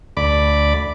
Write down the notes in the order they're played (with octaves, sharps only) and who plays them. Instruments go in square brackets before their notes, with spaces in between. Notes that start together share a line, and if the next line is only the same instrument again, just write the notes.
[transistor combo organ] D2 D5 B5 D6